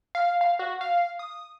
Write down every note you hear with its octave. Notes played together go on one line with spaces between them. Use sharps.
F5
F5
F#4
F5
D#6